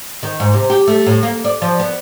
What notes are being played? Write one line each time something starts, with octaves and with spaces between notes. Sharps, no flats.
D#3
G#2
C3
G4
A3
A2
A#3
D5
F3
B3